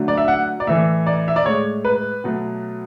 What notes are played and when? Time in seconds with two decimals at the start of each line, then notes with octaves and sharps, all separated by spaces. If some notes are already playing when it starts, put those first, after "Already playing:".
Already playing: D3 F#3 A3
0.08 D5
0.17 E5
0.28 F#5
0.60 D5
0.67 A2 E3 A3 E5
1.07 D5
1.28 E5
1.36 D5
1.46 A2 G#3 C#5
1.85 B4
2.24 B2 F#3 A3